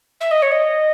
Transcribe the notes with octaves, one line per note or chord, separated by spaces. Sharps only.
E5
D#5
C#5
D#5